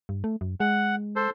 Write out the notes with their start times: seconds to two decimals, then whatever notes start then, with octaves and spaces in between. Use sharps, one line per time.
0.09 G2
0.24 A3
0.41 F#2
0.60 G#3 F#5
1.16 A4 C5